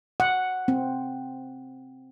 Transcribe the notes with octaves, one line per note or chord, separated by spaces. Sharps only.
F#5
C4